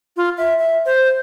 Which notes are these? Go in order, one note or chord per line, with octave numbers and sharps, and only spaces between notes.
F4
E5
E5
C5